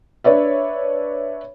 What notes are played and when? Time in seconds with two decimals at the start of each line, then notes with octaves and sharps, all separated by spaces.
0.24 D4 B4 C#5 D5 E5